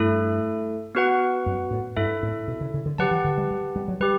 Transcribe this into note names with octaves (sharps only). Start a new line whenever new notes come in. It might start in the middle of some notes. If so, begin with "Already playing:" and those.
Already playing: G2 A3 E4 A4
B3 F#4 B4 F#5
F#2
A2
G2 E4 A4 E5
A2
B2
C#3
C#3
D3
F#3 G4 B4 F#5 A5
E3
D3
G3
G3
G3
F#3
G3 G4 B4